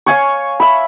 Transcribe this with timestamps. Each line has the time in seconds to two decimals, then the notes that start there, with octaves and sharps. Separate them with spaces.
0.06 C#5 F5 G#5 C#6
0.60 E5 B5